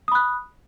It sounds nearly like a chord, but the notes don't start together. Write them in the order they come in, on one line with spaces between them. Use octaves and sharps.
D#6 B5 F#6